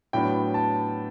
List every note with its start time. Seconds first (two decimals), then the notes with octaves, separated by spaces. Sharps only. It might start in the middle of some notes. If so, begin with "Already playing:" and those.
0.13 A2 F#3 B3 D4 G5
0.54 A5